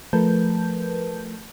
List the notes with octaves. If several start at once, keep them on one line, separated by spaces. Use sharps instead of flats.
F3 A3 A#4 B4 A5 G6